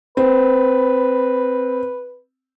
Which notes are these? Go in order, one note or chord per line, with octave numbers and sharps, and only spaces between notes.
C4 B4